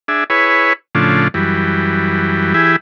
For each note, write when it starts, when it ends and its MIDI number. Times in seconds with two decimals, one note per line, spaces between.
0.08 0.24 62
0.08 0.24 68
0.08 0.24 76
0.30 0.73 64
0.30 0.73 68
0.30 0.73 71
0.30 0.73 73
0.95 1.28 45
0.95 1.28 49
0.95 1.28 53
0.95 1.28 62
1.34 2.54 42
1.34 2.54 52
1.34 2.54 55
2.54 2.76 52
2.54 2.76 64
2.54 2.76 67
2.54 2.76 68